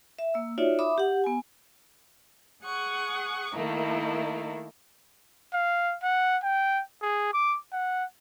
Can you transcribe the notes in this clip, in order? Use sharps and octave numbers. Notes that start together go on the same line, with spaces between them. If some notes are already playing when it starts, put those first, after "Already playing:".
E5
A#3 E6
D#4 F4 F#4 C#5 D5 E5
E5 B5 D6 D#6
G4 F#5
B3 G#5
G#4 F#5 C#6 D#6
D#3 A3 A#3 D#4 E4
F5
F#5
G5
G#4
D6
F#5